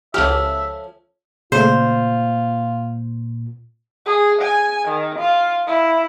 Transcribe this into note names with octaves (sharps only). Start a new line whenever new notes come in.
C#2 F3 A3 C#4 G4 E5 F6
A#2 C#3 A3 F4 C5
G#4
G#5
D#3
F4
E4